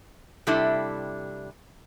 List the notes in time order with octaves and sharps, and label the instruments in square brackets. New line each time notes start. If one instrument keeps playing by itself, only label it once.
[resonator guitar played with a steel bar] C3 G3 D4 E4 A4